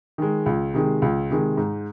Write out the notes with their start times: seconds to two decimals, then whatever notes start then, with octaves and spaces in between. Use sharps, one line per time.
0.18 D#3 G#3
0.46 C#2
0.74 C3 D#3 G#3
1.02 C#2
1.30 C3 D#3 G#3
1.57 G#2